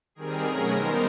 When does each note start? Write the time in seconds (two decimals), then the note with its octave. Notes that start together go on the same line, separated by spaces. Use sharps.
0.15 D#3 G3 C4 G#4 A#4
0.43 B2 F#3 A3 C#4
0.72 D#3 G3 B3 D#4 A#4 C5